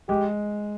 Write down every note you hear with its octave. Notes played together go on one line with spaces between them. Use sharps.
G#3 G4